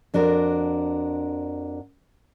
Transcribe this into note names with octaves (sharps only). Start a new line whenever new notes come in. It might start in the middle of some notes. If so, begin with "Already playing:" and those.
F2 D4 F#4 A#4